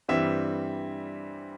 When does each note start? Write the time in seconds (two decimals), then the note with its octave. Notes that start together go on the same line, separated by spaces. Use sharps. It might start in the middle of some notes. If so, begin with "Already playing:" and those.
0.08 G2 E3 G3 C4 E5